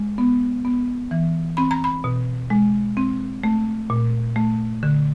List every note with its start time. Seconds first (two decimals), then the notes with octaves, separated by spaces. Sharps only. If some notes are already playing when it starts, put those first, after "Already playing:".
Already playing: G#3
0.18 B3
0.65 B3
1.11 E3
1.57 C4 B5
1.71 A#5
1.84 B5
2.04 B2
2.50 G#3
2.97 C4
3.44 A3
3.90 A#2
4.36 A3
4.83 D3